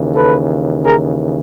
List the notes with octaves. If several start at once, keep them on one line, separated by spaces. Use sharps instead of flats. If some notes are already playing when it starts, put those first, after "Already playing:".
Already playing: D#2 C#3 E3
A4 B4
G#4 A#4